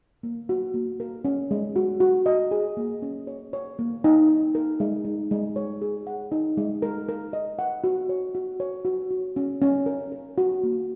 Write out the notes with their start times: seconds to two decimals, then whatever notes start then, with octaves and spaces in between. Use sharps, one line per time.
0.23 A#3
0.49 F#4
0.74 A#3
1.00 A#4
1.25 C#4
1.51 G#3
1.76 F#4
2.00 F#4
2.26 D#5
2.51 G#4
2.77 A#3
3.02 C#4
3.27 C#5
3.53 C#5
3.79 A#3
4.04 D#4
4.29 D#4
4.55 A#4
4.80 G#3
5.05 D#4
5.31 G#3
5.56 C#5
5.82 G#4
6.07 F#5
6.32 D#4
6.57 G#3
6.82 A#4
7.09 A#4
7.33 D#5
7.59 F#5
7.84 F#4
8.09 C#5
8.35 F#4
8.60 C#5
8.85 F#4
9.11 F#4
9.36 C#4
9.62 C#4
9.86 A#4
10.12 A#4
10.38 F#4
10.63 A#3